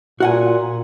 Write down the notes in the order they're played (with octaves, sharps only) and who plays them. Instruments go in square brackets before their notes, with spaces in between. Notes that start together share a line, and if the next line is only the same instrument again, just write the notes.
[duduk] A#2 [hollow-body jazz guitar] F#4 F#5 G#5